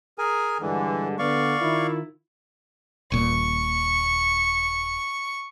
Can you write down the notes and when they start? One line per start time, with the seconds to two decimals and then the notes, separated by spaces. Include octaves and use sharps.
0.18 G#4 A#4 G#5
0.61 G2 D3 E3 G#3
1.19 D3 B3 D5 F5 C#6
1.60 D#3 E4 F4
3.12 D#1 A#2 C#6